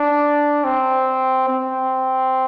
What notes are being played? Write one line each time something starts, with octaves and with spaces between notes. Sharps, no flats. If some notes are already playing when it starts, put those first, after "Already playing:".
Already playing: D4
C4
C4